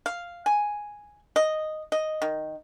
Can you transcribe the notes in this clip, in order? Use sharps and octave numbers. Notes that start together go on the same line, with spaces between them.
F5
G#5
D#5
D#5
D#3